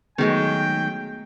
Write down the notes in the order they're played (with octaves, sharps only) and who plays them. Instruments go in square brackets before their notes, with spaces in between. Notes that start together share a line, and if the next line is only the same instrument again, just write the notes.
[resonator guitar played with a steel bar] D#3 F#3 G#3 [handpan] A3 B3 G#4 [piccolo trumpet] G5